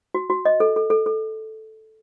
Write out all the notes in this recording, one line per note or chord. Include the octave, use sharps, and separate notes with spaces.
F#4
F#4
D#5
A4
A4
A4
A4